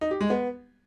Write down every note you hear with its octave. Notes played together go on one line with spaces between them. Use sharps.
D#4
G4
G#3
B3